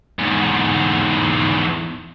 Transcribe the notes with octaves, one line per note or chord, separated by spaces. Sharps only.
E2 G#2